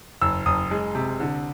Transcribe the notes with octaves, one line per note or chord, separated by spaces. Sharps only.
F#1 E6
F#1 D#6
G#3
C3
D3